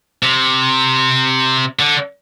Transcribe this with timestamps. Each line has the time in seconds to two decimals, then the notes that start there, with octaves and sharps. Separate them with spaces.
0.23 C3
1.79 D3